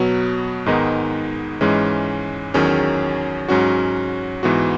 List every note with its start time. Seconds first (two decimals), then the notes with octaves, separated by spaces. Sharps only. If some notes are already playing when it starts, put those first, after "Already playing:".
Already playing: B2 F#3 B3 F#4
0.66 G#2 D#3 G#3 B3 D#4
1.61 G#2 E3 G#3 C#4
2.54 E2 D#3 F#3 C#4 G#4
3.48 G#2 F#3 C#4 F#4
4.43 G#2 E3 B3 F#4